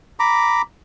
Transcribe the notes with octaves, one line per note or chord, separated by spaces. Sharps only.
A#5 B5 D6